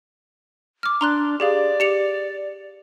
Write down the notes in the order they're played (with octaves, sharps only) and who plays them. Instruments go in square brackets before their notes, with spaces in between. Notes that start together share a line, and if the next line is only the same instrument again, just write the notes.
[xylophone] D6 F6
[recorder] D4 [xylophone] A#5 C6 F#6
[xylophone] G4 G#4 F5 [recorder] D5
[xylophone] G4 C#7 F7